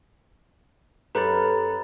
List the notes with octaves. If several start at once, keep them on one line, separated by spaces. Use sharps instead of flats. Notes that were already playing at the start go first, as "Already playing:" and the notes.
F#2 G4 A4 B4 A#5 B5 A6